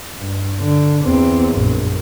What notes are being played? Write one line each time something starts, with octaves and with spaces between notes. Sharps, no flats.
G2
D3
E2 C4
A#1 F#2